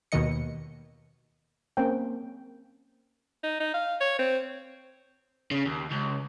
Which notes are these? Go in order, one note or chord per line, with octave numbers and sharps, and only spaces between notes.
D#2 B2 D#3 D#5 C#7
A#3 C4 C#4 G5
D#4
D#4
F5
C#5
C4
C#3
D#2
C#2